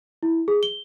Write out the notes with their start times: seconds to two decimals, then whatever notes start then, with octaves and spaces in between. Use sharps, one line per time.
0.23 E4
0.48 G#4
0.63 G7